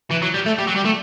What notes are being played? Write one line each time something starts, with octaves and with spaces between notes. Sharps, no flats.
E3
F#3
G3
A3
G3
F#3
G3
A3